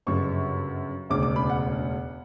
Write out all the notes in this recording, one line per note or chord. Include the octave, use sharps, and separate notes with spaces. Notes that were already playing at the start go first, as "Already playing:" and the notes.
G1 F#2 C#3 C#6
E1 D2 C#3 D6
D6
B5
F#5